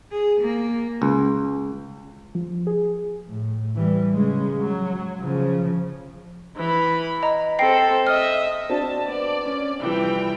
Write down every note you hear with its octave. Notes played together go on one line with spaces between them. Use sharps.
G#4
A#3
C#2
F3
G#4
A2
E3 G3
C#3 G#3
F#3
C#3 F3
E3 B5
D#5 A#5
C4 A4 G5 A#6 C7
D#5 E5 F6
C4 D4 F#4 A5
B3 D5
C#4
C3 E3 F3 G3 G5